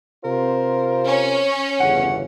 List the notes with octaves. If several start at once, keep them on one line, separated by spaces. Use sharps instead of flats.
C3 F4 A#4 C5
C#4
G1 E2 C#3 F#5